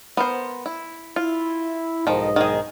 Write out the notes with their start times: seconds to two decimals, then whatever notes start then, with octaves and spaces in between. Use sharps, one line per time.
0.17 B3 A#4 C5
0.66 E4
1.16 E4 F4
2.07 B1 G#2 D#3 F3 D#5
2.36 D#3 G#4